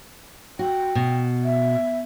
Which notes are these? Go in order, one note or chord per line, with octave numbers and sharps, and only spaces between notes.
F#4 G5
B2
E5